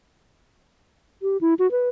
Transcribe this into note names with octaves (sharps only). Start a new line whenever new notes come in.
G4
E4
F#4
B4